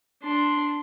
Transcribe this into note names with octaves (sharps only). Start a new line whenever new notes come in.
D4 C6